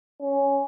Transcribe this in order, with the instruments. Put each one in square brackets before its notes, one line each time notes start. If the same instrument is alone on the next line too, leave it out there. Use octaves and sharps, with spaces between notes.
[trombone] C#4